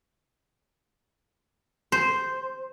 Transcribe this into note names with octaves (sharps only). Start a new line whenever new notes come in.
C5